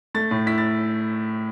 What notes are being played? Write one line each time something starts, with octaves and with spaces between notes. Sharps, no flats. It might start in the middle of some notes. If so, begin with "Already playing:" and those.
A3 A6
A2
E4 B6
A6